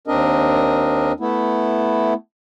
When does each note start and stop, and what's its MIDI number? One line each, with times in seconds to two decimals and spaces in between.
0.07 1.12 39
0.07 1.12 60
0.07 1.12 62
0.07 1.12 70
0.07 1.12 75
1.20 2.14 57
1.20 2.14 59
1.20 2.14 64